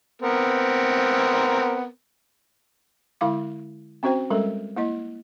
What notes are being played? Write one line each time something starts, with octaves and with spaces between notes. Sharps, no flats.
B3 C4 A#4
D3 G#3 E4 F5 D6
C4 C#4 F#4 C5 G5
G3 G#3 C#4 A4 A#4
A#3 E4 D#5